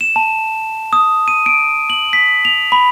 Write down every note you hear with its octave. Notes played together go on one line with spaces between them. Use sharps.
E7
A5
D#6
D#7
D7
F#7
B6
F7
B5